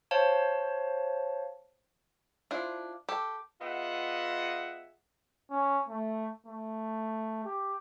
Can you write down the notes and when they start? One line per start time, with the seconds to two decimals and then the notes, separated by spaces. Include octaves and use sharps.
0.11 C5 C#5 F5 A5
2.51 D4 E4 F4 C5
3.09 G4 A4
3.61 B3 F4 G#4 D#5 E5 F#5
5.51 C#4
5.89 A3
6.46 A3
7.44 G4